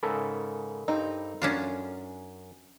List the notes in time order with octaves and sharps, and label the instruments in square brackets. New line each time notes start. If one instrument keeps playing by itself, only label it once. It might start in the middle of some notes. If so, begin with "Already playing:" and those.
[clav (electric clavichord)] G#2 C#3 [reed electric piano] A4 A#4 B5
[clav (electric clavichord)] G2 C4 [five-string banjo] D#4
[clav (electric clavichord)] F#2 [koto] C#4 D4 F4